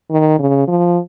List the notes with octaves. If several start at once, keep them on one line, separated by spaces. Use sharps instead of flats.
D#3
C#3
F3